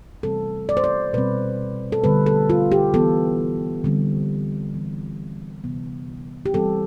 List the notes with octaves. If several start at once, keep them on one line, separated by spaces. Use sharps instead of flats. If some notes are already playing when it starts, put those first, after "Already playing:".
C3 E3 G3 C4 A4
D5
C5
D5
B2 G3 C4 B4
A4
D3 G3 B3 B4
A4
F4
G4
E3 B3 A4
D3 G3 C4
E3 B3
C3 E3 B3
G4
E3 G3 C4 A4